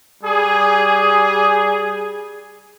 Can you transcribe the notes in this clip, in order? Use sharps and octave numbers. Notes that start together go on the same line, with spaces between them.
G3 G#4